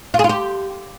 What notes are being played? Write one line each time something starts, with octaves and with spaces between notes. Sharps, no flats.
F4
G#4
F4
G4